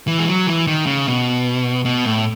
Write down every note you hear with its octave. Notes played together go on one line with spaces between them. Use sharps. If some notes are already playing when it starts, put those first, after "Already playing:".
E3
G#3
F#3
E3
D#3
C#3
B2
B2
A2